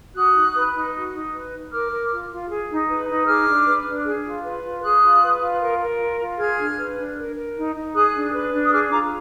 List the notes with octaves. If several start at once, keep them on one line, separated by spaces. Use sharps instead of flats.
F#4 D#6 F#6
D#4
B4
D#4
F#4
D#4
B4
D#4
A#4 D6 F6
A#4
F4
F4
G#4
D#4
B4
D#4
G#4 D6 F6
D4
B4
D4
G#4
F4
B4
F4
G#4 D#6 F#6
F4
B4
F4
A#4
A#4
F4
F4
G#4 F6 G#6
D4
B4
D4
A#4
A#4
D#4
D#4
G#4 D#6 F#6
D4
B4
D4
D#6
G#4 D6 F6
F4 A#5 D6